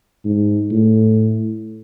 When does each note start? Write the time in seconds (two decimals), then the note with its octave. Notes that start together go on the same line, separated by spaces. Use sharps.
0.25 G#2
0.71 A2